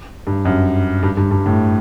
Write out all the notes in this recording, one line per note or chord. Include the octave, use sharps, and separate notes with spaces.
G2
F#2
G2
G2
G2
A2